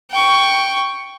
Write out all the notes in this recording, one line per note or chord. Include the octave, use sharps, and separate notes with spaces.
G5 C#6